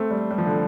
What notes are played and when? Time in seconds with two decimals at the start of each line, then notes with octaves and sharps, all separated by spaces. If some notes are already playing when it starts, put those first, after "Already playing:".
Already playing: A3 C4
0.11 G3
0.31 G3
0.38 F3
0.46 D3